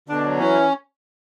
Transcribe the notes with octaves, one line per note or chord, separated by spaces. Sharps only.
B2 D3 D4
F#3
E3 C#4 E4